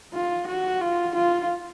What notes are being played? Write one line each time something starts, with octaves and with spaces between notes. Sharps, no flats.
F4
F#4
F4
F4